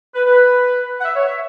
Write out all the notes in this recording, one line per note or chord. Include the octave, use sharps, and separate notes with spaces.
B4
B4
F#5
E5
C#5
E5